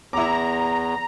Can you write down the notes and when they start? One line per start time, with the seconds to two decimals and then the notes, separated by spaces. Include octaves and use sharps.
0.13 E2 E4 A#5 D6